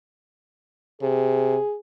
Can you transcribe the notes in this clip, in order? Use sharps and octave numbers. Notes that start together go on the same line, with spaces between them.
C3 G#4